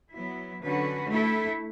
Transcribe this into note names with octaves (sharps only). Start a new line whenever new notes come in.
F#3 B3 E4
D3 F#3 C#4 F#4 B4
A3 E4 A4